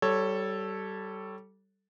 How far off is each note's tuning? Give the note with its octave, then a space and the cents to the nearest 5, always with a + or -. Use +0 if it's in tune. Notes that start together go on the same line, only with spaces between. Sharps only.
G3 -20 A4 +0 C#5 -10